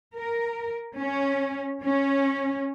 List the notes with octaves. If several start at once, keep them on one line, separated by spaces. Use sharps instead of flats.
A#4
C#4
C#4